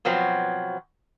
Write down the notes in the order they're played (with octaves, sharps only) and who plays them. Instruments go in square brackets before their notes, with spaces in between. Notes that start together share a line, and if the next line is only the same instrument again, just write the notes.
[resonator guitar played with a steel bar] B2 F3 F#3 B3 C4